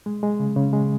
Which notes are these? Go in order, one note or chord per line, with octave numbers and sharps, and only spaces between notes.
G#3
G#3
C#3
C#3
G#3